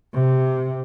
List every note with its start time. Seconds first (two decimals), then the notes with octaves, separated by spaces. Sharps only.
0.14 C3